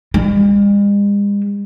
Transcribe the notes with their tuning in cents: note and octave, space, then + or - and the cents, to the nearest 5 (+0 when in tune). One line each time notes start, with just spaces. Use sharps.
G#3 -45